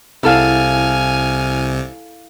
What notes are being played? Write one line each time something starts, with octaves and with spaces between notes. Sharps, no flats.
C2 C3 E4 A4 F5 G#5 F6